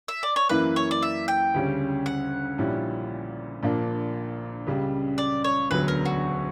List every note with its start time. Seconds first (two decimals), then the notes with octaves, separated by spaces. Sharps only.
0.08 E5
0.23 D5
0.36 C#5
0.49 F#2 E3 A#3 E4 B4
0.76 C#5
0.91 D5
1.03 E5
1.28 G5
1.54 D2 C#3 G3 C#4
2.06 F#5
2.58 A#1 A#2 G3 C#4 E4
3.63 A#1 A#2 A#3 D4
4.67 C#2 C#3 G3
5.18 D5
5.44 C#5
5.70 E1 D2 D3 F#3 B3 B4
5.88 A#4
6.05 F#4